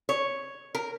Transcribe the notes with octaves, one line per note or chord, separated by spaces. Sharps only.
C#5
A#4